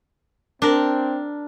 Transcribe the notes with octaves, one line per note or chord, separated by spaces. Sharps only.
C4 D4 A#4